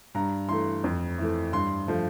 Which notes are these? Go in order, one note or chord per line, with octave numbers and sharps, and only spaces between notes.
G2 A#5
E3 A3 C6
F2
E3 A3
G2 C6
F3 A3